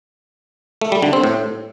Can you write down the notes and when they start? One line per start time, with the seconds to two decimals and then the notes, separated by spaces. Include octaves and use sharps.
0.81 A3
0.92 G3
1.02 D3
1.13 C4
1.23 A2